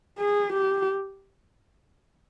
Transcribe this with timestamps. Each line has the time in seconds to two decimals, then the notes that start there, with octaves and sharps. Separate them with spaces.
0.19 G#4
0.53 G4